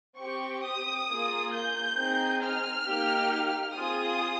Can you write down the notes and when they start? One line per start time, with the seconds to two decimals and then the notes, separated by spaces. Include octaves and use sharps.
0.19 C4 G4 C#6
0.64 D#6
1.09 A#3 F4 G#4
1.54 G6
1.98 C4 D#4 G#4
2.43 F6
2.87 A#3 D#4 G4
3.77 C4 F4 G#4 D#6